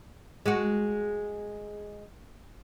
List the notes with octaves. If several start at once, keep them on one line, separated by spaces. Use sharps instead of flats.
G#3 F#4